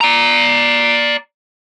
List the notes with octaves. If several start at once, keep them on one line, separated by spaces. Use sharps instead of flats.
D5 A#5